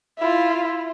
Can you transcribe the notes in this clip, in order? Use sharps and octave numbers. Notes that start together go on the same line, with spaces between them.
E4 F4